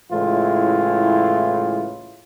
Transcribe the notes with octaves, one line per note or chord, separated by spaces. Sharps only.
A2 C#3 E3 G#3 E4 F4